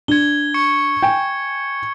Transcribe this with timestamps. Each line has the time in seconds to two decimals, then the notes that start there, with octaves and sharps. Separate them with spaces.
0.08 D4 G#6 G7
0.54 C#6 C#7
1.02 G5 G#5